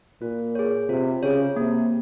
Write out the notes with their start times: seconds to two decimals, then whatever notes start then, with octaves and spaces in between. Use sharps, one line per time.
0.21 A#2 F4
0.55 G#4 C#5
0.89 C3 F4
1.23 C#3 G#4 C#5
1.56 C3 A#3